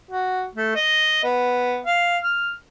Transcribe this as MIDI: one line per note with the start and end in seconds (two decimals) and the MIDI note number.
0.11 0.43 66
0.55 0.71 57
0.75 1.21 75
1.24 1.78 59
1.86 2.18 77
2.23 2.53 89